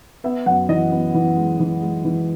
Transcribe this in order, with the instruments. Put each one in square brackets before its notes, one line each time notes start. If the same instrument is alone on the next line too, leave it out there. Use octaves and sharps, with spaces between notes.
[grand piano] B3 E5
F#2 F#5
E3 D#5
B3
E3
G#3
E3
G#3
E3